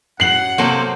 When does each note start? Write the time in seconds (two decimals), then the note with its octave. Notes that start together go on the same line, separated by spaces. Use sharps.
0.20 F#2 F#5 C7 F#7
0.58 C3 F#3 A#3 A4 A#4 C5